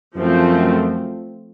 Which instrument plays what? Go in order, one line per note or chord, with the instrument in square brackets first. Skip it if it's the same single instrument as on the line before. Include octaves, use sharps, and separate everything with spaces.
[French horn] F#2 [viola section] F3 A3 C4